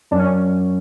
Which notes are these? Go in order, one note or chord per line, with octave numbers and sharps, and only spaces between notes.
F#2 D4
C#4